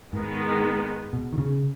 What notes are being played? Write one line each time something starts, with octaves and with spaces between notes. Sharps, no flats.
G#2 D#3 G#3 B3 D#4
B2
D#3
C#3